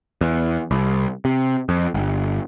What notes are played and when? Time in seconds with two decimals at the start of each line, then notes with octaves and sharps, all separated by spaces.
0.21 E2
0.71 C2
1.25 C3
1.69 F2
1.94 G1